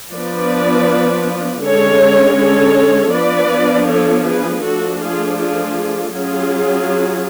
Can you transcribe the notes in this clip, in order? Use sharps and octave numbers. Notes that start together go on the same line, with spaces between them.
F3 B3 D4 B4 D5
D3 G#3 C#4 A4 C#5
A4 C#5
F3 B3 D4 B4 D5
A4 C#5
G#4 B4
F3 A3 D4 F#4 A4
F4 G#4
F4 G#4
F#3 C#4 F4 G#4